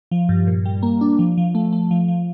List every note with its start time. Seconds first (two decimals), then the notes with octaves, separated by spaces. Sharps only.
0.11 F3
0.29 G2
0.47 A#2
0.65 G3
0.83 A#3
1.01 D4
1.19 F3
1.38 F3
1.55 A3
1.73 A3
1.91 F3
2.08 F3